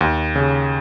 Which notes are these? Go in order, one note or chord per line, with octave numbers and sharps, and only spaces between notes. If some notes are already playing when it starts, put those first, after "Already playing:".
D#2
C#3